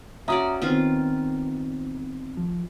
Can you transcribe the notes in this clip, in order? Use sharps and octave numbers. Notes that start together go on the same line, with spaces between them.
C#4 F#4 D5 E5 A#5 D#6
D#3 B3 C4 F4
F3